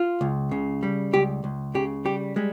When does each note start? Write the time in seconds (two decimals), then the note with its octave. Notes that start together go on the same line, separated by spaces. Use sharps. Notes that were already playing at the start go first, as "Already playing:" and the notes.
Already playing: F4
0.21 C#2
0.51 C#3
0.83 G3
1.13 C#2 G4
1.44 C#2
1.74 C#3 G4
2.05 G3 G4
2.36 G3 G#3